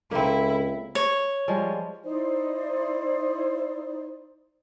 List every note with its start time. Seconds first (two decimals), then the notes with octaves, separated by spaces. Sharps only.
0.11 C#2 A#3 C4 E4 A4
0.95 C#5
1.48 F3 G3 G#3
2.04 D#4 E4 C5 D5